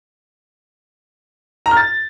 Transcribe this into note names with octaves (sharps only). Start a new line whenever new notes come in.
A#5
F6
A6